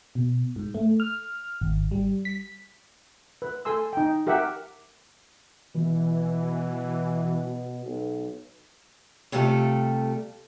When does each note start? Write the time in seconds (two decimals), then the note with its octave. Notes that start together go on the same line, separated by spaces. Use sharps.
0.15 B2
0.56 G#2
0.74 A3
1.00 F6
1.61 G#1
1.91 G3
2.25 B6
3.42 B4
3.65 A4 G#5 C6 E6
3.93 D#4 G5
4.27 G4 A#4 E5 F#5
5.75 B2 E3
7.86 B1
9.32 C3 G3 A3 F4 A4